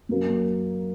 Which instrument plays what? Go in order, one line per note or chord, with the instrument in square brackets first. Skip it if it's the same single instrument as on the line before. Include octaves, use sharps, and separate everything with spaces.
[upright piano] F#2 F#3 A#3